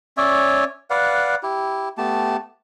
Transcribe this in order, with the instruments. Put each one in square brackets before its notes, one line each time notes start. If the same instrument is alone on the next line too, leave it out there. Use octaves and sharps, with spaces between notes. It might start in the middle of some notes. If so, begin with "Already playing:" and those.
[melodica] C#4 C#5 D5 E5
B4 D5 F5 F#5
E4 G4
A3 B3 G4 A5